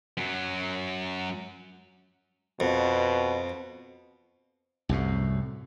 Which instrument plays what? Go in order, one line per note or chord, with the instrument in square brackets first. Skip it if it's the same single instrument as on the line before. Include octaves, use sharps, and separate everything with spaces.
[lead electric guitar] F#2 F#3
[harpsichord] F2 [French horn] B2
[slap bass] C2 F#2 A2